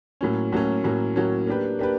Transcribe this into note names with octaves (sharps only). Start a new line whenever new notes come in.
A2 F#3 A#3 C#4
A2 F#3 A#3 C#4
A2 F#3 A#3 C#4
A2 F#3 A#3 C#4
A#3 D4 G4 B4
A#3 D4 G4 B4